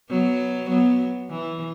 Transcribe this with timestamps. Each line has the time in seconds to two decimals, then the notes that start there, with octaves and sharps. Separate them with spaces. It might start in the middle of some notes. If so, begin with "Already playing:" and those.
0.09 F#3 B3
0.69 F#3 B3
1.30 E3